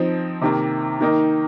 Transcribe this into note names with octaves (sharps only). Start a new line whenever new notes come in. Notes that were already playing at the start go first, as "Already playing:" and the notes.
Already playing: F3 C4 D#4
C3 D#3 A#3
D#3 A#3 D#4